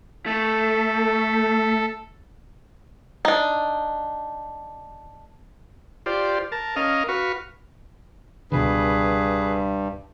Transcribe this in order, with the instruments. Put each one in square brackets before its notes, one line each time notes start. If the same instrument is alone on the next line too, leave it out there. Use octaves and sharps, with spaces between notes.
[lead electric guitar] A3 [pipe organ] A4
[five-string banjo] D4 D#4
[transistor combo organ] F4 G4 C5 D5
A#4 A5
C#4 A#4 D#5 F5
F#4 B4 F5 C#6
[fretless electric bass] C#2 B2 D3 [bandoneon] G2 [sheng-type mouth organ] G#4 B4